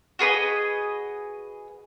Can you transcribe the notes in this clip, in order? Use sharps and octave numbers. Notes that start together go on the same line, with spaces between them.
F#4 G#4 B4 D#5